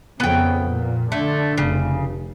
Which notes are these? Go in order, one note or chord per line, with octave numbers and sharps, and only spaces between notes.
F2 C#3 B3 G5
A#2
D3 A3
F1 C#3